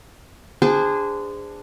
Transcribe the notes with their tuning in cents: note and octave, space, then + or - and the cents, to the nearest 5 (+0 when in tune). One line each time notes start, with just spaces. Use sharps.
D4 +0 G#4 -20 C5 -25